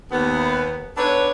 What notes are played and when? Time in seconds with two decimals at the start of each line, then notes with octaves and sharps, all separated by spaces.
0.12 D#2 B3
0.97 B3 D4 D#4 A4 B4 C#5